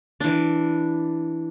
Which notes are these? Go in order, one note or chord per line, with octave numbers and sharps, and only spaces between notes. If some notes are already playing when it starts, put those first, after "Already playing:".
E3 D4